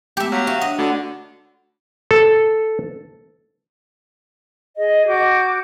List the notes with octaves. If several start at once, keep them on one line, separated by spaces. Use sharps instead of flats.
G#3 A3 B3 G4 E5
F#3 F5 F6 B6
F#4 C#5 E5 C#6
D4 D#5 F#5
D3 A3 F#4
A4
G#4 D#5
F#4 D6 G6